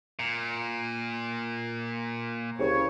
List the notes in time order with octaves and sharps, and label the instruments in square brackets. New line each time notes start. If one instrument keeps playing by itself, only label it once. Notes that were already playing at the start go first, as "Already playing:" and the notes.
[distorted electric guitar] A#2
[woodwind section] C2 C#3 C#5